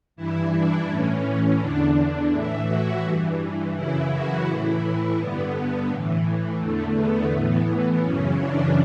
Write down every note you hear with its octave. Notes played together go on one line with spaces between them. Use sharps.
G2 E3 E4
D4
A2 E3 C#4
E2 D3 D4
A2 E3 E4
F#4
G2 E3
F#2 C#3 E3 E4
F#4
A2 E3 E4
G2 D3 B3
A2 E3
E2 D3 A3
B3
A2 E3 B3
F#2 C#3 E3 C#4
D4